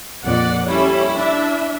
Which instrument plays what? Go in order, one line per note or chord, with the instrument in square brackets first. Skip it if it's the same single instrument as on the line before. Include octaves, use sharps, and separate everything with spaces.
[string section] A#1 F2 [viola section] D5 F#5
[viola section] G3 C#4 A4 [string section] E4
[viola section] D4 E5